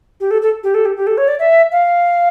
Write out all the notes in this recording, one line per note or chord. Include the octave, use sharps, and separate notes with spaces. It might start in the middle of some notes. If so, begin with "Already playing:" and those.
G4
A4
A4
G4
A4
G4
G4
A4
C#5
D5
E5
F5